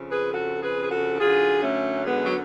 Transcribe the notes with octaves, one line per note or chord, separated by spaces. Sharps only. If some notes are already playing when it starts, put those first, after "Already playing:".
Already playing: F2 C#3
G#4 B4
F#4 A4
G#4 B4
G#4
F#4 A4
F#2 D3 F4 G#4
A3 C#4
G#3 B3
F#3